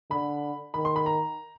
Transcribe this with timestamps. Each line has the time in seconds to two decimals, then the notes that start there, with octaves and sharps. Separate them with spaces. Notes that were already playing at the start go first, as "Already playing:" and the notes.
0.10 D3 B5
0.74 D#3 B5
0.85 C6
0.96 B5
1.06 A#5